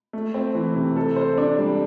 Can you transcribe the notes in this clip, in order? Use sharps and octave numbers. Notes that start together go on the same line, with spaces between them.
A3
C4
E3
C3
A4
C5
D4
G3